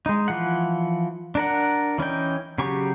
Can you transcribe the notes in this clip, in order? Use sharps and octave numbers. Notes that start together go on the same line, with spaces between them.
G#3 D#4
E3 F3 F#5
D4 A#4 F#5
E3 C#4 D#4 G5
C#3 F#3 G4 C#6